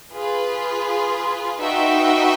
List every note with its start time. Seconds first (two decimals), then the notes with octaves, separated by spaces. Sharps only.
0.14 F4 G#4 B4
1.60 D#4 F#4 B4 E5 G5